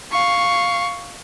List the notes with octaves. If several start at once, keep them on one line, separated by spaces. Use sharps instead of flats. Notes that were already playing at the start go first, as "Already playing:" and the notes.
F5 C#6